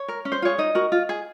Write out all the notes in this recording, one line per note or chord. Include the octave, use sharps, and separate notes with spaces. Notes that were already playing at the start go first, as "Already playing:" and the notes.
Already playing: C#5
A#4
C#4
C5
F4 G#4 C#5
D#4 D#5
F#4 A#4
F4
G#4